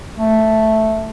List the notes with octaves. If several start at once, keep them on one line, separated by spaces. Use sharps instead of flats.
A3